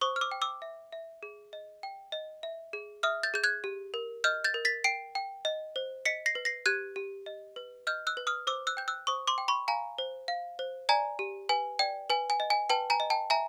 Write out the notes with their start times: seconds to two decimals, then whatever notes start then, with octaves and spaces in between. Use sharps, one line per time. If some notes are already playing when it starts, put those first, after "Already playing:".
0.01 C5 C#6 D#6
0.16 F6
0.21 D6 E6
0.31 G5
0.42 D6 E6
0.62 E5
0.93 E5
1.23 G#4
1.53 D#5
1.83 G5
2.12 D#5
2.43 E5
2.73 G#4
3.03 E5 D#6 F6
3.23 G6 A6
3.34 G#4 G6
3.44 F#6 G#6
3.64 G4
3.94 A#4
4.24 D#5 F6 G6
4.44 G6 A6
4.54 A#4
4.65 A6 B6
4.84 G5 C7 D7
5.15 G5
5.45 D#5
5.76 C5
6.05 D#5 B6 C#7
6.26 A#6 C7
6.35 B4
6.45 A#6 C7
6.66 G4 F#6 G#6
6.96 G4
7.26 D#5
7.56 B4
7.87 D#5 F6 G6
8.07 E6 F#6
8.17 B4
8.27 D#6 F6
8.47 C5 D6 E6
8.67 E6 F#6
8.77 G5 G6
8.88 E6 F#6
9.07 C5 C#6 D#6
9.27 C6 D6
9.38 G5
9.48 B5 C#6
9.68 F5 G#5 A#5
9.98 C5
10.28 F5
10.59 C5
10.89 D5 G#5 A#5
11.19 G4
11.49 B4 G#5
11.79 D5 G5
12.10 B4 G#5
12.30 G#5
12.40 D#5
12.50 G#5
12.70 B4 G5 A5
12.90 G#5 A#5
13.00 D#5
13.10 G5 A5
13.30 E5 G#5 A#5